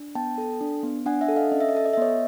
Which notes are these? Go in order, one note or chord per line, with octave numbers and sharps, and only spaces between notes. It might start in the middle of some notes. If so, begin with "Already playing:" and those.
Already playing: D4
B3 G5 A5
A4
D4
B3
D4 F#5 G#5
E5 F#5
A4
D#5 F5
C#4 D#5
E5
D#5
A4 E5
D#5
E5
B3 C#5 D#5